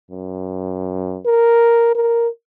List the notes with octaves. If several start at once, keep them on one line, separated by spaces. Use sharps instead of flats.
F#2
A#4
A#4